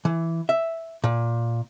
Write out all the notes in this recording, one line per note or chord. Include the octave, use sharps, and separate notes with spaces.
E3
E5
A#2